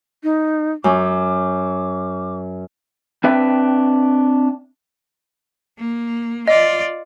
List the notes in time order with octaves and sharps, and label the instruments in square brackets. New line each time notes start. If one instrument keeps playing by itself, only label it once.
[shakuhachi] D#4
[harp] F#2 [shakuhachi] D6
[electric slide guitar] C4 D4 B4 E5 G5
[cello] A#3
[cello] F4 D5 [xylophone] D#5